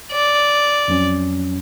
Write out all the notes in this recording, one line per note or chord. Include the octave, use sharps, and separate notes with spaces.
D5
F2 F#3 C#4